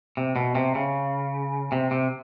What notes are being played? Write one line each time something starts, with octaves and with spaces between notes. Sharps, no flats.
C3
B2
C3
C#3
C3
C3